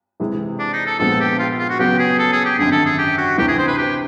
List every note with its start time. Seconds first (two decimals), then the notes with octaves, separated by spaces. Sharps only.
0.20 C3 E3 G#3
0.59 D4
0.73 D#4
0.86 A4
0.99 A#1 A#2 F3 G#3 B3 A4
1.20 G4
1.39 F4
1.59 F4
1.70 F#4
1.79 C#3 F#3 B3 G4
1.99 G#4
2.19 A4
2.33 G#4
2.45 G4
2.58 G#1 F#2 D3 G#4
2.72 A4
2.86 G#4
2.98 G4
3.18 F#4
3.38 D2 C3 E3 G4
3.48 G#4
3.58 C5
3.67 B4
3.78 G4